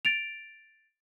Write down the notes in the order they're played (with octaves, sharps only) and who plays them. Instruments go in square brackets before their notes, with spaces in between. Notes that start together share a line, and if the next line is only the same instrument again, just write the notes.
[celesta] A6 D7 F7